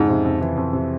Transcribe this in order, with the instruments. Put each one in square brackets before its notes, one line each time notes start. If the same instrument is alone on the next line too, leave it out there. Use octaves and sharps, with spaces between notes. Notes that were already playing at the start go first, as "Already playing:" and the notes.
Already playing: [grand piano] F2 C#3 [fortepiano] G#2
[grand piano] C3
F2
E3
F2
C3